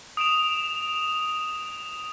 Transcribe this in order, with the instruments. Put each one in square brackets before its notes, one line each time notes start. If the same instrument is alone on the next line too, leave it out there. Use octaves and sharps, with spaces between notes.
[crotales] D#6 D7 E7 F7